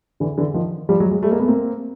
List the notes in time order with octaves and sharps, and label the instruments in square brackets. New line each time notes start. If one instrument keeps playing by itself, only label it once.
[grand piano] D3 E3
D3 E3
D#3 F3
F3 G3
F#3 G#3
F#3 G#3
G3 A3
G#3 A#3
A3 B3
A#3 C4